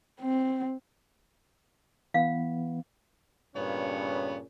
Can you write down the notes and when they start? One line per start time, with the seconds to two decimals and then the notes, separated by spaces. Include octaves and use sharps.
0.21 C4
2.14 E3 B3 F5
3.56 G2 A#2 C#3 B3 C#4 C#5